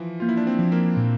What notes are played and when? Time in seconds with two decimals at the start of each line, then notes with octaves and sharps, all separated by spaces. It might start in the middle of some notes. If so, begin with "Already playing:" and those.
Already playing: E3 F3
0.20 A#3 F4
0.29 E4
0.37 D4
0.47 C4
0.59 F3
0.72 A#3
0.97 A#2